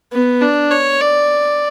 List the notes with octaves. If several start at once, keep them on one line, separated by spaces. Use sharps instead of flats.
B3
D4
C#5
D5